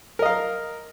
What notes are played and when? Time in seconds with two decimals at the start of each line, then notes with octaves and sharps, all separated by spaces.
0.19 A#4
0.22 D#5
0.26 F5